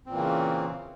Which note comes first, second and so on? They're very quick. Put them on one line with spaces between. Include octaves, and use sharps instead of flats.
C4 A#2 E3 A#3 C#3